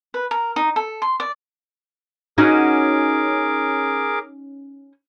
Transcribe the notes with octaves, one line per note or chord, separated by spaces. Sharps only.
B4
A#4
D#4
A4
C6
D5
C#4 D#4 F#4 G#4 A#4 D6